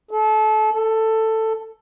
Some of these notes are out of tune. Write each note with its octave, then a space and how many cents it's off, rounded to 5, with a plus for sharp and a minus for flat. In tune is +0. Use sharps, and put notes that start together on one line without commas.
A4 -30
A4 +10